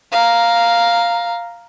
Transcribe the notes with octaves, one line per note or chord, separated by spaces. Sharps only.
F5 A#5